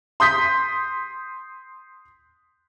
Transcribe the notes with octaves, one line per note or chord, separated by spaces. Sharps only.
C6 D#6 G6 B6